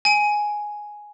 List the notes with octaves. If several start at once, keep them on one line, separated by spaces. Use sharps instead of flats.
G#5 D7